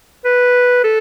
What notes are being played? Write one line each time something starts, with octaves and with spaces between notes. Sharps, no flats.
B4
A4